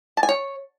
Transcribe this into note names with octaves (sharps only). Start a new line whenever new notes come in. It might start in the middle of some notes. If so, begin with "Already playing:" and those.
A5
G#5
C#5